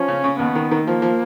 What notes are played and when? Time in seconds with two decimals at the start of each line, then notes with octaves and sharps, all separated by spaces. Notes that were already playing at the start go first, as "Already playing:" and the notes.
Already playing: F3 C#4
0.08 C#3
0.24 C#3
0.39 D#2 B3
0.55 D#3
0.71 D#3
0.86 F3 A#3
1.02 F3